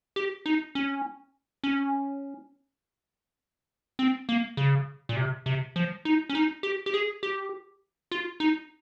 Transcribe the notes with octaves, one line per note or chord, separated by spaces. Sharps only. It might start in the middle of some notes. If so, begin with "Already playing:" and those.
G4
D#4
C#4
C#4
C4
A#3
C#3
A#2
C3
C3
F3
D#4
C#4
D#4
G4
G4
G#4
G4
F4
D#4